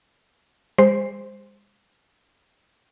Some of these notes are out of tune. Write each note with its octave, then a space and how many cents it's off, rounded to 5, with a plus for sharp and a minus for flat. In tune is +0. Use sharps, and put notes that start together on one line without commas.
G#3 -40 C5 +0